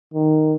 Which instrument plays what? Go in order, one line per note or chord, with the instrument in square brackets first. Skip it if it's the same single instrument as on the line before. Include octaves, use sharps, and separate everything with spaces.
[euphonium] D#3